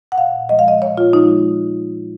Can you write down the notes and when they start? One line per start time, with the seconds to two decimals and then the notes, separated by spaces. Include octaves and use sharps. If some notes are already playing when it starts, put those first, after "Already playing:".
0.12 F#5
0.18 A#2 F5
0.49 F3 G#3 D#5
0.59 F5
0.68 D#5
0.82 A#2 C#5
0.98 F4
1.13 F3 G#3 D#4